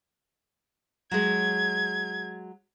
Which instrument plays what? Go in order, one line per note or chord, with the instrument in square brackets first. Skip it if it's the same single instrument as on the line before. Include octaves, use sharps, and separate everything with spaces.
[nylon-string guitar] F#3 G#3 [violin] G#6